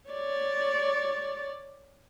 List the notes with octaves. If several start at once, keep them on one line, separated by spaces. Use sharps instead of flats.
C#5 D5